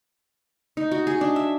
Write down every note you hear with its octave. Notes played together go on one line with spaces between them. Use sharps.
D#4
F#4
G#4
D4
E5